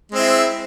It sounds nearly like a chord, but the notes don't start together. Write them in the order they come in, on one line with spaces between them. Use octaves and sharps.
G#3 C4 E4